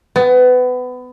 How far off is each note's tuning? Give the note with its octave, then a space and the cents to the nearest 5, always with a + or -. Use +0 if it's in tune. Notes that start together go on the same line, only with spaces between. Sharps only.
B3 +25